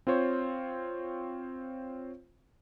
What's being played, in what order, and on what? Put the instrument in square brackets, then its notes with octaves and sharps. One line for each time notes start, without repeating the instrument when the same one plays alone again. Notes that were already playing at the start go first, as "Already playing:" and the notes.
[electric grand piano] C4 F4 C5 C#5